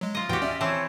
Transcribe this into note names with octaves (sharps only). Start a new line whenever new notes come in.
F#3 G#3
F4 D#5
D#2 A2 E3 F#4 G4 G5
C#4 D5 E5
E3 C4 C#5 A5